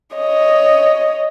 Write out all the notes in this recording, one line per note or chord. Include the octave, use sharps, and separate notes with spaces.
C#5 D#5